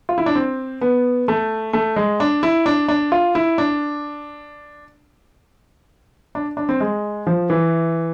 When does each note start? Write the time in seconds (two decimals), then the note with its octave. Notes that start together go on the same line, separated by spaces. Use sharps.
0.09 F4
0.18 E4
0.26 D4
0.35 C4
0.81 B3
1.28 A3
1.73 A3
1.96 G#3
2.20 D4
2.43 E4
2.66 D4
2.88 D4
3.12 F4
3.35 E4
3.58 D4
6.35 D4
6.57 D4
6.69 C4
6.80 G#3
7.27 F3
7.50 E3